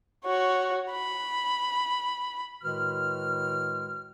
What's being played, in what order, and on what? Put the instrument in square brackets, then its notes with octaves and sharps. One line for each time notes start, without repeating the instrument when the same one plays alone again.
[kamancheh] F#4 C#5
B5
[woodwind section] A2 D#3 G#3 F#4 B4 F6